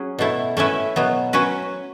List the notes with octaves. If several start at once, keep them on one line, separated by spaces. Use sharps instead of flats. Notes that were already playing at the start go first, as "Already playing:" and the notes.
Already playing: F#3 C#4 G#4
B2 A3 E4
A3 C#4 E4 B4 E5
B2 F#3 B3
F#3 C#4 F#4 B4